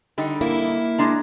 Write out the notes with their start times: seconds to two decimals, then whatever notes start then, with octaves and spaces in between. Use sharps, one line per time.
0.18 D3 G3 D#4
0.41 A#3 E4
0.98 G#3 D4 A#5